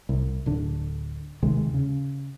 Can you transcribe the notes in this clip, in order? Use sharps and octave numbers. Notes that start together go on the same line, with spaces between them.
C2
D1 D3
D#2 C3 D#3 G#3
C#3